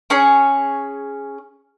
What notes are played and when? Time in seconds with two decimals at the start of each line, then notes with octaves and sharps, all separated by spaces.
0.10 C#4 G#4 C#5